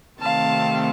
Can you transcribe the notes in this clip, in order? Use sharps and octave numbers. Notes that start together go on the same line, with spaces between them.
C3 D#3 A3 C4 F5 A5